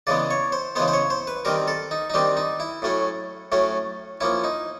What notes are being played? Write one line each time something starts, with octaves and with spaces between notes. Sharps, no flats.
C#3 E3 G#3 B3 D5
C#5
C5
C#3 E3 G#3 B3 C5
C5
C#5
C5
B4
D#3 G3 C4 A#4
A4
D#4
D#4
D#3 G3 C4 D4
D#4
E4
A2 F#3 A3 C#4
A2 F#3 A3 C#4
F3 A#3 C#4 E4
D#4